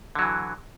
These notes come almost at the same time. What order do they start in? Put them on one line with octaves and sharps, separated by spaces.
D3 F#3 E3